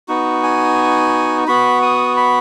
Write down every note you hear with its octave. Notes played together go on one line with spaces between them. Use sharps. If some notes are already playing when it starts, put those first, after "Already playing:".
B3 D#4 F#4
G#5
B3 F#4 B5
D#6
B5